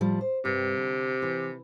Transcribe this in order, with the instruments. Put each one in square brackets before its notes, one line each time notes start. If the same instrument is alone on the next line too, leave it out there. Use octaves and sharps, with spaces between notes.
[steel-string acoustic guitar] A2 F3 G3
C5
[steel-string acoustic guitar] G2 [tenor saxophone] C3
[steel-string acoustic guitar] D3
E3